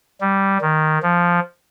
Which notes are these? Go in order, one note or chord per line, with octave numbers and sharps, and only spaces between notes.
G3
D#3
F3